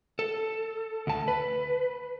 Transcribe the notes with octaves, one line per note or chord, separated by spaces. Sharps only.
A4
D2 A5
B4